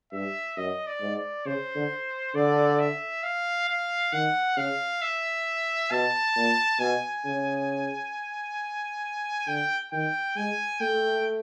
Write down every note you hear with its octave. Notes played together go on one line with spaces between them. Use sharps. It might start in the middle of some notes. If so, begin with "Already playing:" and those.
G2 E5
F#2 D#5
D5
G#2
D5
C#3 C5
D3
D3 D5
E5
F5
F5
D#3 F#5
C#3 F5
E5
B2 A5
A#2
B2 G#5
C#3
D3 G5
D#3 G5
G#3 G#5
A3 G5